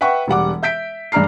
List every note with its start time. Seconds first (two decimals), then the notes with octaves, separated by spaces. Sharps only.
0.01 B4 E5 F#5 G5 C#6
0.28 E1 G3 F#5 D6
0.63 E5 G6 B6 D7
1.12 G2 G#3 D4 A#5 F6 C7